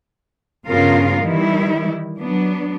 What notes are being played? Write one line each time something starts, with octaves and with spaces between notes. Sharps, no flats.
G2 C#3 B3 F4 A#4 F5
D#3 E3 G3 E4
F#3 B3 D4